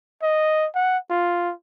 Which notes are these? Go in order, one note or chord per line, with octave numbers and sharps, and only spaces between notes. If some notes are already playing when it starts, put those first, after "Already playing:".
D#5
F#5
F4